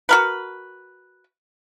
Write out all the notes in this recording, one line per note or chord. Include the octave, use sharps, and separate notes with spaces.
F#4 A#4 B4